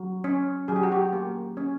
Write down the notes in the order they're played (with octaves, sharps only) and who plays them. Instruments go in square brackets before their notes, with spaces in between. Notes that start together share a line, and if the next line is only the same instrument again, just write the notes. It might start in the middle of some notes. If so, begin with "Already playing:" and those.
Already playing: [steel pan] F#3
C#4
F#3 G#4
G4
F#4
G4
A#3
C#4